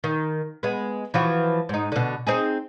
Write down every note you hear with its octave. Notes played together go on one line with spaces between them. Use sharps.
D#3
G#3 B3
E3 F3 F#4
G#2 D#4
B2 D3
C4 D#4 G#4